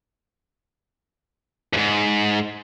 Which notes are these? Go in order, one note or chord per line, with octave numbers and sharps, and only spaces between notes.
E2 G#2